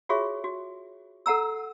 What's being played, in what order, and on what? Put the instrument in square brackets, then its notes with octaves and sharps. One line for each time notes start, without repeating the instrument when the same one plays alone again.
[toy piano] F4 F#4 G#4 C#5 E5 C#6
F#4
A4 F#5 A#5 E6